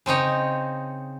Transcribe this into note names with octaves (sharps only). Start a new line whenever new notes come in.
C#3 C4 D#4 C#5